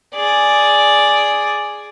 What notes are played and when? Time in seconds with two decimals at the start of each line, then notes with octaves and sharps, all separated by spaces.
0.15 G#4 D5